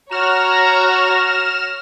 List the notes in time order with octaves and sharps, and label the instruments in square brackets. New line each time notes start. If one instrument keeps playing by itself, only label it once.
[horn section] F#4 [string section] C#5 A#6 [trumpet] A#5 [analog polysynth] F6 E7